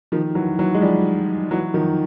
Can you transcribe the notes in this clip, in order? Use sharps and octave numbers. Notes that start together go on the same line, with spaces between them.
D#3 F3
E3 F#3
E3 F#3
G#3
F3 G3
E3 F#3
D#3 F3